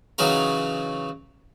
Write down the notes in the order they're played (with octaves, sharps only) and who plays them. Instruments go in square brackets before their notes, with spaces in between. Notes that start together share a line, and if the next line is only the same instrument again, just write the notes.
[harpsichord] C#3 E3 F#3 D#4 F#4 A#4